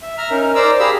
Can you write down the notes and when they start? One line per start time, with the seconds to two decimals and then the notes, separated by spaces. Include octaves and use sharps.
0.02 E5
0.18 E5 A#5 F6
0.31 C#4 D#4 A#4
0.55 A#4 C5 D5 A#5 D6 E6
0.80 G4 G#4 F5 A#5 B5 E6